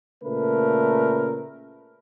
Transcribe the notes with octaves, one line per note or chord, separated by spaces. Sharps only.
A#2 C#3 A3 A#4 B4